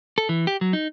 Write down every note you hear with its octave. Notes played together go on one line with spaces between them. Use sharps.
A4
E3
G4
F#3
D#4